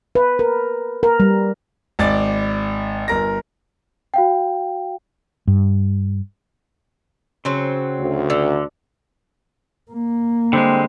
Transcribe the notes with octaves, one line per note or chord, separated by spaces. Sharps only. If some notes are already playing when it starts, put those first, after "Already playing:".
B4
A#4
A#4
G3
G#1 D5 A6
G1 A#4 A#6
F#4 F5 G5
G2
C#3 F#3 C4
D2
D3
A#3
D3 G3 G#3 C4